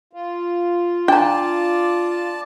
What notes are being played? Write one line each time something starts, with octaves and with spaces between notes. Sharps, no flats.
F4
D4 D5 G5 A5 A#5